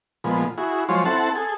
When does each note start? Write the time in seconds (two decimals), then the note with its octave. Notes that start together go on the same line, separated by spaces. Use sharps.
0.24 A#2 F3 G#3 B3
0.58 E4 F#4 G#4
0.89 F3 F#3 G#3 F4 C5 C#5
1.05 C4 E4 A4 F#5 A5
1.35 G#4 A4